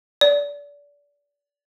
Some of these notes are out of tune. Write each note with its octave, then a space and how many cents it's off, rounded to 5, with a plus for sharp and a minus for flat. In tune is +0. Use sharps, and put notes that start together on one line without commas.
D5 -30